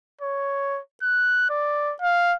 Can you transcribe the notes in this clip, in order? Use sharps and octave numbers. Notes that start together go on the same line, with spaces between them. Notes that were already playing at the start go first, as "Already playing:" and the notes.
C#5
F#6
D5
F5